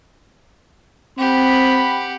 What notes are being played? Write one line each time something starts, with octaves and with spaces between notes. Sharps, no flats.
C4 G4 F#5 B5